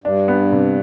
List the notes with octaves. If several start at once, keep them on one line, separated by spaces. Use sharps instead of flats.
G2 D4
B3
C3